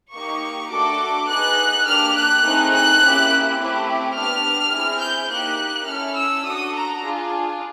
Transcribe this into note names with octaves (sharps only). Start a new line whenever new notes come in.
A#3 D#4 G4 C#6
A3 D4 F#4 A4 D6
B3 D#4 G#4 F#6
A#3 D4 G4 F6
F#6
A3 C4 D#4 G#4
F#6
A#3 C#4 E4 G4
A3 C4 E4 G4
B3 D4 G4 F6
C4 E4 G#4
G6
A#3 D#4 G4 F#6
C#4 E4 A4 F6
E6
D4 F#4 A4 D#6
A#5
D4 F4 G#4